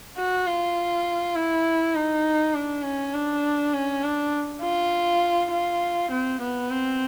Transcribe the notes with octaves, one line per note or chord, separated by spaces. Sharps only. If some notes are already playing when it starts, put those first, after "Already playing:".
F#4
F4
E4
D#4
D4
C#4
D4
C#4
D4
F4
F4
C4
B3
C4